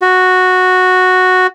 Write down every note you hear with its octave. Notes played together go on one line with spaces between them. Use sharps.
F#4